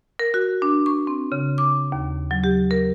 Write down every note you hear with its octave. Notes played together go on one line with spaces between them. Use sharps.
A#4
F#4
D4
C#6
C4
C#3
D6
D#2
F#3
G4
A#4